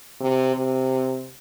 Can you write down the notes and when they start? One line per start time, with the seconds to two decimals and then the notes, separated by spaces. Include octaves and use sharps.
0.20 C3
0.54 C3